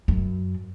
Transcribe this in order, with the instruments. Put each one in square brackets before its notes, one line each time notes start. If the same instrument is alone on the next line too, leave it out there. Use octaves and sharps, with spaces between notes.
[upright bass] F#2